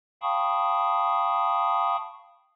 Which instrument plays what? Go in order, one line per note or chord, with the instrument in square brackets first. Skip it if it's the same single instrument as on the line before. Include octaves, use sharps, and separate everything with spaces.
[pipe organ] F5 G5 A5 B5 C#6 D#6